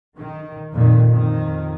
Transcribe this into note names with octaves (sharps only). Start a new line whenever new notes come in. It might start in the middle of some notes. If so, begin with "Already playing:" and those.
D#3
F2 A#2 D#3
F2 D#3